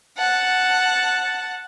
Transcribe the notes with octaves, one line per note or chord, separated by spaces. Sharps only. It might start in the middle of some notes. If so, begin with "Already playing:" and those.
F#5 A5